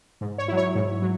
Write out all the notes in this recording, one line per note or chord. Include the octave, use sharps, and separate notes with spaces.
G#2
C#5
F#3 E4
C#5
G#2
F#3